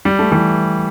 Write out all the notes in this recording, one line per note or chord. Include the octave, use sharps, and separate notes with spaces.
G3
A3
E3 G3